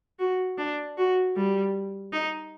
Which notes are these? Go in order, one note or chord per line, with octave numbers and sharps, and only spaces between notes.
F#4
D4
F#4
G3
D#4